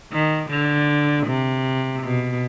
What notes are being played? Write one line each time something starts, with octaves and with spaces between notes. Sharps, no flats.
D#3
D3
C3
B2